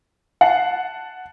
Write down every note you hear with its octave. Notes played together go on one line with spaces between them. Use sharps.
F#5 A5 C7